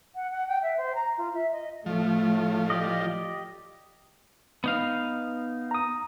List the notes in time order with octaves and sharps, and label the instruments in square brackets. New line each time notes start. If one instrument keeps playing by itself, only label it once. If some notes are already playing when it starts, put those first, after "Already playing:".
[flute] F#5
F#5
G5
E5
C5
A#5
F4
E5
D#5
[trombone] A2 [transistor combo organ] F3 [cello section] A3
[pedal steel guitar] G4 D5 D#5
[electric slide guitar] B3 D#4 F5
[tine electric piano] A#5 D#6